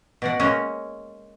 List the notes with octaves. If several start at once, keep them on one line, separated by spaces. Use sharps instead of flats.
B2 D5 F#5
G#3 A#3 C#4